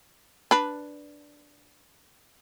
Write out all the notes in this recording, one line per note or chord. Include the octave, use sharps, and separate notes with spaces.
D4 B4